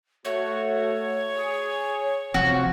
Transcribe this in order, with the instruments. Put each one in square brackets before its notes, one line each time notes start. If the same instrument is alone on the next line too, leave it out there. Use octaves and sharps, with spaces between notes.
[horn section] A3 F#4 [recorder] C#5
[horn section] G#4
[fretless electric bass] F1 F2 C4 [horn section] F3 [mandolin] F#4